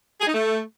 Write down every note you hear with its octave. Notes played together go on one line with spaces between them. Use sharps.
G#4
D#4
A3